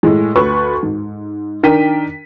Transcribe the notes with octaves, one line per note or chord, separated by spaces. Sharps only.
A2 G#3
D2 B4 C#6
G#2
D#3 D4 A#4 G5 B6 D#7